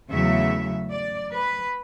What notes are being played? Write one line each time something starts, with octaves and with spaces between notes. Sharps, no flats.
E2 C#3 F#3 A3 E5
D5
B4